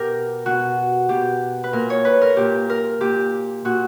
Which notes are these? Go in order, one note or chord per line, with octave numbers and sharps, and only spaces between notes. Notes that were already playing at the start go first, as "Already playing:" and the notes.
Already playing: B2 G4 A#4
B2 F#4
B2 G4
B4
A#2 A#4
C#5
B4
A#4
A#2 G4
A#4
A#2 G4
A#2 F#4